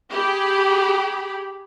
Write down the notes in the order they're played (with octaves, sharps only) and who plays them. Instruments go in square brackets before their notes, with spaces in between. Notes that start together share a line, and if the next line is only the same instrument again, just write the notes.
[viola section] G4 G#4 B5